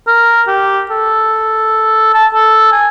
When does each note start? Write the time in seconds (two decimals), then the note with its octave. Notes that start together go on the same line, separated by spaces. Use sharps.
0.07 A#4
0.47 G4
0.90 A4
2.14 A5
2.34 A4
2.72 G#5